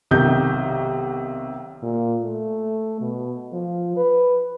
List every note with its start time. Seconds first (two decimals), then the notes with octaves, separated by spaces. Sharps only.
0.11 B1 C3 D#3 G6
1.82 A#2
2.22 A3
3.01 B2
3.52 F3
3.97 B4